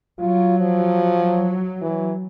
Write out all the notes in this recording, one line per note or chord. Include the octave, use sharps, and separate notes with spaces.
F#3 F4
F3
E3